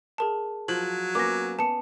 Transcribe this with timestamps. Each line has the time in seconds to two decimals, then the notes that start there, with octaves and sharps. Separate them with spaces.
0.18 G#4 A#4 A5
0.68 F3 F#3 F#7
1.15 A#3 B3 C#4 D6 A#6
1.59 B3 A5 C#7